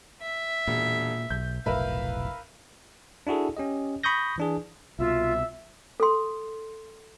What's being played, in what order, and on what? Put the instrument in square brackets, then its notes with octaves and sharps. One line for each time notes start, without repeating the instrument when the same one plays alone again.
[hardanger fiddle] E5
[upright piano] E1 [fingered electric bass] A#2
[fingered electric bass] B1 [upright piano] G6
[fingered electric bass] F1 B1 A2 [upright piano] A#4 B4 E5 [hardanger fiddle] F5
[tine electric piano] D4 E4 F#4 G#4 A4
C#4 G4 D#5
B5 C#6 D#6 G6 A#6
E3 D4 G#4
[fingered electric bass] C2 B2 [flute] F4 [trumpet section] E5
[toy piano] A4 C6